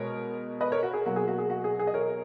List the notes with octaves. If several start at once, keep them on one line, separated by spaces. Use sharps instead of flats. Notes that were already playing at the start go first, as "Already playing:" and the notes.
Already playing: B2 G#3 A#4 C#5
B4 D#5
A#4 C#5
F#4
G#4
B2 F#3 A#3 F#4
G#4
F#4
G#4
F#4
G#4
G#4
D#5
A#4 C#5